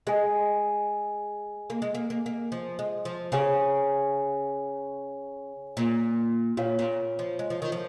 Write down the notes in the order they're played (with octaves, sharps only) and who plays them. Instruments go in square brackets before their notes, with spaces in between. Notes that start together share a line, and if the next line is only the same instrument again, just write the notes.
[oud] G#3 [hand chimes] G#4 D#5 G#5
[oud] A#3
G#3
A#3
A#3
A#3
F3
G#3
F3
[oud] C#3 [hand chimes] G#4 C#5 F5 G#5
[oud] A#2
[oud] A#2 [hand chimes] F4 C#5 F5
[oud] A#2
F3
G#3
F3
D#3
F3